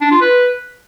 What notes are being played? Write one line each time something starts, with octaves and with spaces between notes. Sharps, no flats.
D4
F4
B4